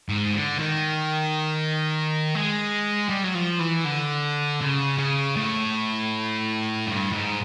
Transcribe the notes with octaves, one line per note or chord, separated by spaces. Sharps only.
G#2
D3
D#3
G#3
G3
F#3
F3
E3
D3
C#3
C#3
A2
G2
G#2